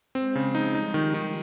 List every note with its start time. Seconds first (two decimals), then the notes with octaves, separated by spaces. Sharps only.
0.15 G#3 C4
0.35 C#3
0.45 F3
0.55 D#4
0.74 G3 D#4
0.94 D#3
1.04 G#3
1.14 D#3